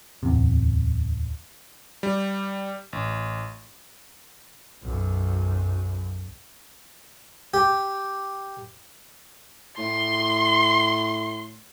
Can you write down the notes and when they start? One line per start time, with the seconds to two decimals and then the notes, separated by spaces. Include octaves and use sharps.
0.23 D1 E2 C3
2.03 G3
2.93 A1
4.82 B1 F#2
7.54 G4
9.78 A2 C6